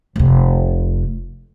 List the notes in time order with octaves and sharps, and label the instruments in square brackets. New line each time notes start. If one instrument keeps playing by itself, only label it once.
[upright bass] F1 C3